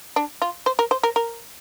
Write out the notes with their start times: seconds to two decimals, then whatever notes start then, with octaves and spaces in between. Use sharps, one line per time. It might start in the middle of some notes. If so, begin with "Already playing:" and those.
0.16 D4
0.42 F4
0.66 C5
0.79 A#4
0.91 C5
1.03 A#4
1.16 A#4